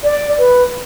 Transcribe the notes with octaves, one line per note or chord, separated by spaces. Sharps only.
D5
B4